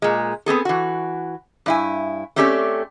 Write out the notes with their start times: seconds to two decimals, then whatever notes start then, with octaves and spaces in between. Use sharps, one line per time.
0.02 A#2 G#3
0.46 B3 C4 G#4 A4
0.65 E3 F#4
1.66 G2 E4 G#5
2.36 A3 C4 C#4 G4 A4 D5